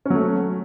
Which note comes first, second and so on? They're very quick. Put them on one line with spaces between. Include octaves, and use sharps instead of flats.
C#4 F#3 A3